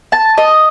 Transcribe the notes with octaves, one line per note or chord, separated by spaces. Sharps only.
A5
D#5